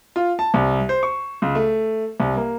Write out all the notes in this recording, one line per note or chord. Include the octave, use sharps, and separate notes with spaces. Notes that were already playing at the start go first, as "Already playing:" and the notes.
F4
A5
C2
C5
C#6
C#2
A3
C2
A#3